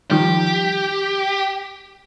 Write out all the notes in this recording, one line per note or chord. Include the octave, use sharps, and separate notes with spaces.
D#3 F3 G3 G4